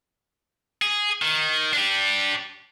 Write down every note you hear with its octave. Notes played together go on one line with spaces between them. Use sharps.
G#4
D#3
D4 G4